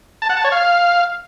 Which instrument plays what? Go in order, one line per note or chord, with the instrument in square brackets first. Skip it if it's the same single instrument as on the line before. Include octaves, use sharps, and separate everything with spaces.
[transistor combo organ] A5
F#5
A5
C#5
F5